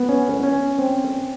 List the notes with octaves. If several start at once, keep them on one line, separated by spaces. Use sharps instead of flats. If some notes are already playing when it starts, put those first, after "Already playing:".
Already playing: B3
C#4
C#4
C4